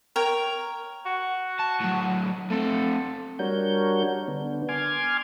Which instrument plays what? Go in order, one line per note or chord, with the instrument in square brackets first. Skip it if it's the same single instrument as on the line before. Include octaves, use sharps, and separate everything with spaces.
[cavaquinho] A#4 C#5 G5
[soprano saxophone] F#4
[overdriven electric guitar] A5
A2 F#3
[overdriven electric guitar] A3 C4 [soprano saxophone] A4
[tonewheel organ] G3 D4 F#4 A#4 C#5 G6
D3 B3 D4
G#5 C6 D6 F6 G#6